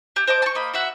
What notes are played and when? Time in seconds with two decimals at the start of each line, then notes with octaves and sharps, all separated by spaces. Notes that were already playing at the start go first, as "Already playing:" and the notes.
0.16 G4 E5
0.27 C5 D#5 A5 D6
0.42 A5 C#6
0.55 A#3 D#5 B5
0.73 F#4 E5 F#5